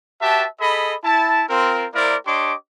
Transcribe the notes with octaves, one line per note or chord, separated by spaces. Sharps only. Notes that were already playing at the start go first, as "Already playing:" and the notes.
F#4 G4 B4 E5 A5
G#4 A4 D#5 B5
E4 A5
C4 F4 A#4
A#3 E4 A#4 C5 D5
D4 G4 C#5 D#5 C6 D6